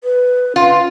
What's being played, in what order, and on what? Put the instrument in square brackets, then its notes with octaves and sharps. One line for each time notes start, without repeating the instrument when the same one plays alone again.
[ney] B4
[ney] C#4 [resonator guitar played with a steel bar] F4